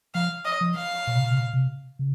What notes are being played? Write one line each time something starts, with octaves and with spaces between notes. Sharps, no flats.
F3 F5
D#5
F3
F5
A#2
C3
A#2
C3
A#2
C3
C#3